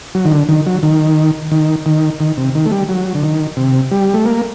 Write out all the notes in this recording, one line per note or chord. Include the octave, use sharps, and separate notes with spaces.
F#3
D#3
D3
D#3
F#3
D#3
D#3
D#3
D#3
C3
D#3
A3
G3
F#3
D3
D#3
C3
G3
A3
A#3